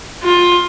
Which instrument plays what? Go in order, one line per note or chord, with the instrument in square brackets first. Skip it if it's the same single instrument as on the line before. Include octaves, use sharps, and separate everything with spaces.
[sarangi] F4